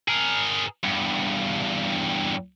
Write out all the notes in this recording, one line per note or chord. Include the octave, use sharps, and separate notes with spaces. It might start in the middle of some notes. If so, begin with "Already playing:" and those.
G#4 A#4
E2 G2